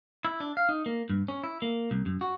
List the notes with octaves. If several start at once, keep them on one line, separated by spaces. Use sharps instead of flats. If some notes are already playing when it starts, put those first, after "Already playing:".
E4
D4
F5
D#4
A#3
G2
C#4
E4
A#3
C2
F#2
F#4